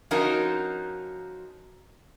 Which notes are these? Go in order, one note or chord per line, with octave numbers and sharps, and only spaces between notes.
F3 C#4 D#4 F4 F#4 A#4